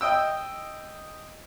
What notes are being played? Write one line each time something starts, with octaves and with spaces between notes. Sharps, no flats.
D#5 G5 E6